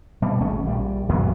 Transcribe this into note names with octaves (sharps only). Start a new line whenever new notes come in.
B2 G3
G#1 A3 C#4
A#1 G3
B1 F#2 F#3 B3